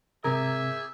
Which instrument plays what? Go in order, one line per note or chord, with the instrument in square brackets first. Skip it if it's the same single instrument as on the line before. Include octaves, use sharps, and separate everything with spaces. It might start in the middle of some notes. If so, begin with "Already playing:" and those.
[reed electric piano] G#2 C3 C4 [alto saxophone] G#4 [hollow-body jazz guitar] A#4 [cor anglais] E5